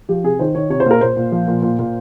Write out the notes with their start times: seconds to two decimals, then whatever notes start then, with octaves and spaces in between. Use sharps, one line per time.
0.09 F3 G4
0.24 C3 G#4
0.39 D#3 C5
0.55 D#3 C#5
0.70 C3 C#5
0.80 C5
0.86 A#2 A#4
1.01 A#2 C5
1.17 A#2
1.32 F3
1.48 A#2
1.62 A#2
1.79 A#2